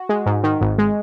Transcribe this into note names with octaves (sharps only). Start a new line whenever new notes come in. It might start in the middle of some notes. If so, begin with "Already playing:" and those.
Already playing: F#4
G#3
G#2
D#3
G#1
G#3